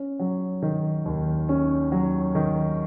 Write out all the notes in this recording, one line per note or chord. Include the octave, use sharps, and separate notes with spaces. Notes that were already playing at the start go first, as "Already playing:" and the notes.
Already playing: C#4
F#3
D#3
D#2
C#4
F#3
D#3